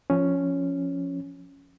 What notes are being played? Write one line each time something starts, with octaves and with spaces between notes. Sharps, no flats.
F3 C#4